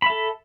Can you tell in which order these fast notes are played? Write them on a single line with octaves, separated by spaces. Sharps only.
B5 E5 A4